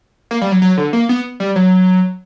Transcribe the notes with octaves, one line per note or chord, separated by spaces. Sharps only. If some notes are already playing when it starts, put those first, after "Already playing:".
A#3
G3
F#3
F#3
D3
A#3
B3
G3
F#3